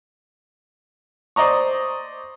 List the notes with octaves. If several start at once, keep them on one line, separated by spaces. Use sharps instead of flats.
C5 D5 D#5 A#5 C#6